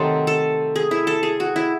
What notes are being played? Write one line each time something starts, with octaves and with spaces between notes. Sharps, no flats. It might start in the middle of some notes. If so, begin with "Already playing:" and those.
Already playing: C3 D#3 F#3 A3 A4 C5
A4
G#4
E4
A4
G#4
F#4
E4